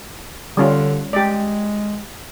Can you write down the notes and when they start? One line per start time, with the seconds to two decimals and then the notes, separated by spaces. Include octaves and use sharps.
0.57 D3 G3 C#4 F4
1.13 G#3 G4 D5